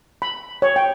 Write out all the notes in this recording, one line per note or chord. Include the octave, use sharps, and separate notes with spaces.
B5
C#5
G5